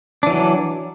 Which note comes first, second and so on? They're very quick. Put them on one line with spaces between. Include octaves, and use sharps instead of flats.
D4 E3 F#3